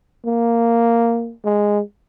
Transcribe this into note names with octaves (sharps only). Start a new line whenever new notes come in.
A#3
G#3